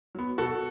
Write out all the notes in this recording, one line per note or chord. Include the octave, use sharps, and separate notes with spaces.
F#3 B3
B2 F#4 A4